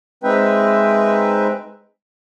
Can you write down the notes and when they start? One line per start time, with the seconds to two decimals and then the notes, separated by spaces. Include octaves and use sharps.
0.24 G#3 C4 D#4 B4 E5 G5